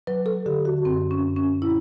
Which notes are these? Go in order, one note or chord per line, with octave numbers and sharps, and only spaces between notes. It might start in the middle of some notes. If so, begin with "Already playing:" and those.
F#3 B4
A4
D3 G4
F#4
F#2 C4
C#4
F#2
C#4
A#2 E4